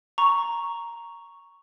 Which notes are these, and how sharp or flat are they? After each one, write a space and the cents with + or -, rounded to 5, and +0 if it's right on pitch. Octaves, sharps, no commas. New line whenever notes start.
A#5 +0 C#6 +5